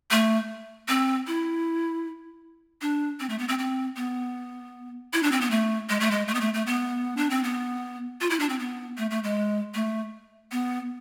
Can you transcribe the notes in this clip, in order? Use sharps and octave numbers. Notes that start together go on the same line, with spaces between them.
A3
C4
E4
D4
C4
A3
B3
C4
C4
B3
E4
D4
C4
B3
A3
G#3
A3
G#3
A3
B3
A3
A3
B3
D4
C4
B3
F4
E4
D4
C4
B3
A3
A3
G#3
A3
B3